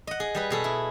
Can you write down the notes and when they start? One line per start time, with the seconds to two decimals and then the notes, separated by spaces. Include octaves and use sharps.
0.07 D#5 F#5
0.20 G#4
0.35 G3 G#4 B4
0.50 B2 G#4 A4
0.64 E4